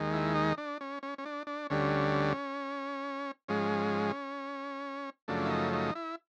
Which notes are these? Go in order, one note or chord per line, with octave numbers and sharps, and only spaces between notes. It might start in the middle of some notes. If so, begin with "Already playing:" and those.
Already playing: D#2 D#3 G#3
E4
D#4
D4
C#4
C#4
C#4
D4
D4
D2 D3 G3 C#4
G#2 F3 G#3 C#4
F#2 C#3 F3 A3 D4
E4
D#4
D#4
E4